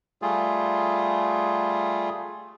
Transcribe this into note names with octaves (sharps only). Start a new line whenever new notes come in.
G3 A3 F4 G#4